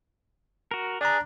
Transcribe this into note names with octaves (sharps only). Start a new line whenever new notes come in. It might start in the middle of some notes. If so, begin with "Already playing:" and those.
F#4 A#4
D4 G#4 D5 A#5